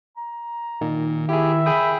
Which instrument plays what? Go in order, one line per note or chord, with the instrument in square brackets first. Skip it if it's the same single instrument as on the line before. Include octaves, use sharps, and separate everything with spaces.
[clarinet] A#5
[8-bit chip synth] A#2 [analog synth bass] D#3
[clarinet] E4 [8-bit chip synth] G4 G#4 [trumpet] E5
[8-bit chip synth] G#4 G5 D#6 [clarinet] B5